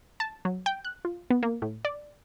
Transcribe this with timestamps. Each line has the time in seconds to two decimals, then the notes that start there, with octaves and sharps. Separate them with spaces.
0.20 A5
0.45 F#3
0.66 G5
0.85 F#6
1.05 F4
1.30 B3
1.43 A#3
1.62 A2
1.85 D5